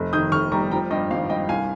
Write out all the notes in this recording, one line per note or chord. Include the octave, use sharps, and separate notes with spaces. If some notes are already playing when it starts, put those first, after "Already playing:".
Already playing: F1
D#3 D#6 G6
F1 C#6 F6
G3 A#5 C#6
F3 G5 A#5
G2 D#5 G5
G#1 F5
G2 D#5 G5
C2 F5 G#5